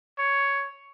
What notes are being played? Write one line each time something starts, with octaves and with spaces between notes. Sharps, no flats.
C#5